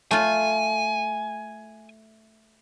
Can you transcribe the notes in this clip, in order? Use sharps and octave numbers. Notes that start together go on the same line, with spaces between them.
A3 F4 G#5